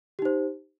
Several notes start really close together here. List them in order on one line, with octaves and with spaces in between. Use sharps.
G4 D#4 C5